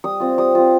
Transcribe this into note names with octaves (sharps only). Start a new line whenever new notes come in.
G3 D#6
C4 F4
G3 D#6
C4 F4